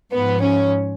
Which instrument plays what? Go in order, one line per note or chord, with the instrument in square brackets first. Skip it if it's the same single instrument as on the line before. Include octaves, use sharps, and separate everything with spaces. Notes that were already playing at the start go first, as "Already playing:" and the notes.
[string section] G#2 F3 B3
C#4